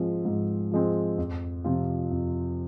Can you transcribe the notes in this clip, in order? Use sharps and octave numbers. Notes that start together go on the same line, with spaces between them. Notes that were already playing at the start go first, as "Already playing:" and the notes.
Already playing: G#2 F3 G#3 C4
G#2
F3 G#3 C4
F2
C3 F3 C4 F4
F2